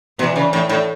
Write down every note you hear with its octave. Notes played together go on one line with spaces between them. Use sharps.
B2 E3
C#3
A2
A2